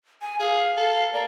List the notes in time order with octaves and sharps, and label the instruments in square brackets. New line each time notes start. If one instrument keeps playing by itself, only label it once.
[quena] G#5
[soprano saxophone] G#4 [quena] F5
[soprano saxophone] A4
[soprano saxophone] A#3 [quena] D5